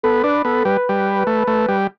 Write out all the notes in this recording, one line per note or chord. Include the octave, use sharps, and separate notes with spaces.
B3 A4
D4 B4
B3 A4
G3 B4
G3
A3
A3
G3